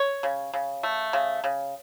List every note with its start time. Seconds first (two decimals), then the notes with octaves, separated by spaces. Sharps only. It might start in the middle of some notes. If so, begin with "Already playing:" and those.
Already playing: C#5
0.23 C#3
0.53 C#3
0.83 A3
1.13 C#3
1.44 C#3